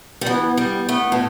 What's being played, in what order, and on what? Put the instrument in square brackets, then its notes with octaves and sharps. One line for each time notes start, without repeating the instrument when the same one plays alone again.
[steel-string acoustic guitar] G3
[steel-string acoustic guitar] E3 [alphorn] B3
[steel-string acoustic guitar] G3 [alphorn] B3
[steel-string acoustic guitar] A3 [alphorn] B3
[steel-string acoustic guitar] A2